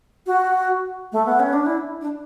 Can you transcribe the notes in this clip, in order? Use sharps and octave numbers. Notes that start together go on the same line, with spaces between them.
F#4
A3
B3
C#4
D4
E4
D4